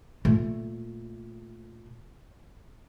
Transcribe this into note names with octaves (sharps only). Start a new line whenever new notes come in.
A#2 A3